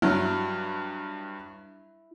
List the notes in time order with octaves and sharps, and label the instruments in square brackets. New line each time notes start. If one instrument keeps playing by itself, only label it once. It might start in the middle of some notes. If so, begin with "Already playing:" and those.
[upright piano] G2 F#3 [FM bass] E4